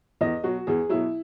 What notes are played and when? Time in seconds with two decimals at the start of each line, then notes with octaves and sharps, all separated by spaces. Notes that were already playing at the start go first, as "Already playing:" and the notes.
0.21 E2 D#5
0.44 B2 F#3 F#4
0.67 E2 G#4
0.89 B2 F#3 E4